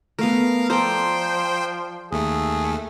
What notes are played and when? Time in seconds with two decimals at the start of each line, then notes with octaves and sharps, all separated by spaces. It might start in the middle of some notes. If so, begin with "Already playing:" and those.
0.19 A3 B3 A#4 F5
0.70 F3 A4 C5 D5 G5 A#5
2.12 D#2 A3 G#4